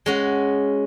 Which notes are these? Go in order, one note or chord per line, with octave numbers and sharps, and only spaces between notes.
G#3 C#4 F#4